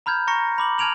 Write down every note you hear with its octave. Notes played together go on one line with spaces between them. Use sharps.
A#5 B5 F6 G6 G#6
A#5 C#6 A#6 C#7
B5 D6 F#7
A5 F6 G#6 D7 F7 F#7